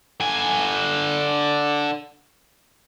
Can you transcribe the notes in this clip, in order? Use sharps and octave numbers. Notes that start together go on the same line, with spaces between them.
D3 G#5